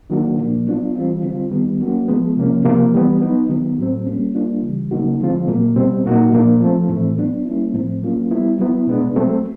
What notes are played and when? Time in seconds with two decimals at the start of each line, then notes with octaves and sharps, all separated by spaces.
0.10 D#3 F#3 A#3 D4 F#4
0.38 A#2 F3 A#3 D4
0.67 F#3 B3 D4 F4
0.95 E3 G3 C4 F4
1.23 D3 G3 C4 F4
1.51 D#3 G3 B3
1.80 F#3 A#3 C#4 F#4
2.08 F3 G#3 B3
2.37 C3 F3 A#3 C#4
2.65 C3 F3 A#3
2.93 E3 G3 B3
3.21 F#3 B3 D#4
3.49 D#3 F#3 B3
3.78 A2 F#3 A3 C4
4.07 G3 A#3 C#4
4.35 G3 A#3 D4 F4
4.62 C#3 E3 G3
4.91 C#3 F#3 A#3 D#4 F#4
5.19 D3 F3 G#3 C4 F4
5.47 A#2 F#3 A#3
5.76 B2 G3 C4
6.05 A#2 F#3 A#3 D#4 F#4
6.33 A#2 F3 A#3 D4
6.61 F3 A3 C4
6.89 A2 E3 A3 C4
7.17 F#3 B3 D4
7.45 G3 A#3 C#4 E4
7.74 A2 F3 A3 C4
8.02 F#3 A#3 C#4 F4
8.31 G3 B3 E4
8.59 F#3 B3 E4
8.87 B2 G#3 B3 D4
9.16 F#3 A3 C4